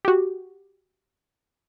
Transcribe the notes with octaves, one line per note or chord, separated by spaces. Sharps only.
F#4 G4